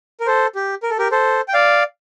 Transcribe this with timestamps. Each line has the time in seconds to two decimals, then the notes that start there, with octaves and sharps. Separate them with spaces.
0.20 A#4
0.26 A4 C5
0.55 G4
0.83 A#4
0.90 A4
0.99 G4 A#4
1.12 A4 C5
1.48 G5
1.54 D5 F5